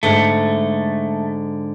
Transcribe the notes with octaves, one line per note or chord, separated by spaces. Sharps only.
G#2 D3 A3